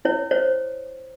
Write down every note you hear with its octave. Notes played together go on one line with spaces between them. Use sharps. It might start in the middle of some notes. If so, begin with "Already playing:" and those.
E4 C#5
C5 C#5